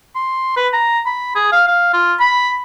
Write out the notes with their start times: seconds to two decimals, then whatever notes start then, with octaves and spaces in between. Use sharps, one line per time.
0.15 C6
0.57 B4
0.73 A#5
1.06 B5
1.36 G#4
1.52 F5
1.68 F5
1.94 F4
2.20 B5